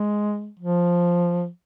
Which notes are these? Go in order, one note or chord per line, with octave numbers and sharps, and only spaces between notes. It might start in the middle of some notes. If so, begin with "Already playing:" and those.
Already playing: G#3
F3